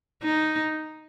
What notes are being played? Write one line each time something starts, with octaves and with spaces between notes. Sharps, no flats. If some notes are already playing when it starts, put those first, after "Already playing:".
D#4